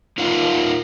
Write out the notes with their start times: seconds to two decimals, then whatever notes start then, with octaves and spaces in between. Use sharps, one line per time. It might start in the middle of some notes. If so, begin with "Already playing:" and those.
0.18 D#4 F4 A#4 D5 F5 F#5